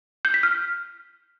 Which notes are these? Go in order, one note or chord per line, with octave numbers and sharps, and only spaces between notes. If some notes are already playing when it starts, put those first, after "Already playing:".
G6
B6
F6